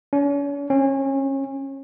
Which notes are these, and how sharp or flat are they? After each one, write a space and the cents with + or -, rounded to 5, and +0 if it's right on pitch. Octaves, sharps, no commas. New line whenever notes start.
C#4 +40
C#4 -30